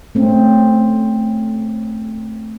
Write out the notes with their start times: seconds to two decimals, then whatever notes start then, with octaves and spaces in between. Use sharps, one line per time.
0.15 A3 C4 C#4